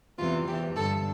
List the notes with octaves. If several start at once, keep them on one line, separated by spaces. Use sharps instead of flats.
E2 C3 E3 F4
E2 E3 G4
G2 D3 A4